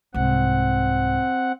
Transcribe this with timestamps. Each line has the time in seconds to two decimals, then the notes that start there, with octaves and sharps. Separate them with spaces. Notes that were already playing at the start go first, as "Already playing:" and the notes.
0.14 C2 G#2 C4 F#5